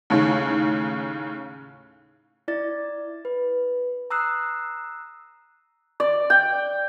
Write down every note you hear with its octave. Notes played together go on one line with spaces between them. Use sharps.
D#2 A2 C#3
E4 D5 A6
B4
A#5 D#6 E6 F#6 C7
D5
G5